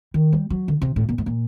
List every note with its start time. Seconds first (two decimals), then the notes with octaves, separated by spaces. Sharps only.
0.14 D#3
0.33 G3
0.50 F#3
0.68 D3
0.81 C3
0.96 A2
1.09 A#2
1.18 A2
1.26 A#2